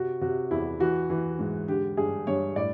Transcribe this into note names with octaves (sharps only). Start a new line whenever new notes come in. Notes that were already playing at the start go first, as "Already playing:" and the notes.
Already playing: C3 F#4
C3 F#4
E2 E4
E3 F#4
E3
G#2
D3 G4
G2 G#4
G2 C#5
A2 D5